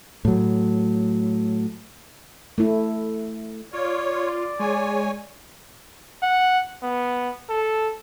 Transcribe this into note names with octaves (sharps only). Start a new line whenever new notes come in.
A2 F#3
A3 E4
F4 C#5 D5
G#3 C#5 G#5
F#5
B3
A4